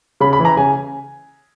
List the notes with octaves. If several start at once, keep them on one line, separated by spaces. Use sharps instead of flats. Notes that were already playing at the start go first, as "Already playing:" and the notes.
C#3 B5
B5
E3
A#5
C#3 G#5